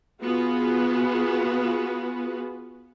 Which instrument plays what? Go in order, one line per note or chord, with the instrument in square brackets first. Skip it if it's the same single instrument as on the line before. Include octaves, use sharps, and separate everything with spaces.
[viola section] B3 F4 F#4 G#4 B4